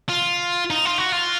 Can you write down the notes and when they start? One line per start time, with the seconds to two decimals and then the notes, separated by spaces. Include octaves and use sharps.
0.09 F4
0.70 D#4
0.85 F4
0.98 F#4
1.12 F4